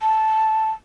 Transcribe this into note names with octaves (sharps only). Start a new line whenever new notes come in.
A5